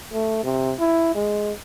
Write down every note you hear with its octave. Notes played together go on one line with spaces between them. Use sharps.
A3
C3
E4
G#3